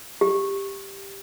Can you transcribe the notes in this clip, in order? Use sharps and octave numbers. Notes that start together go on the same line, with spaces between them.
G4